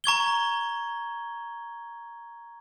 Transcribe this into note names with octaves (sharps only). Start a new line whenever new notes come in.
A#5 C#6 G#6 G7